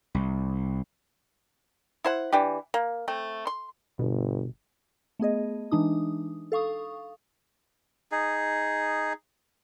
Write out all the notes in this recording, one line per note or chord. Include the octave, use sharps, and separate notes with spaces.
C2
E4 C5 F#5
E3 D4 G4
A#3
A3 C4
C6
G1 B2
A3 B3 G#4 D#5
E3 G#3 D4 D#4 D#6
A4 F5 C#6 D#6
D#4 G#4